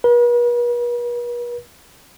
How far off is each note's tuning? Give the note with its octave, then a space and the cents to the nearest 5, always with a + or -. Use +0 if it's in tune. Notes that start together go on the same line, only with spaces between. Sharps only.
B4 -45